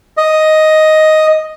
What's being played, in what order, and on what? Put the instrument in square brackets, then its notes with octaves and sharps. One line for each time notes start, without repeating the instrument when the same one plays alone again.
[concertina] D#5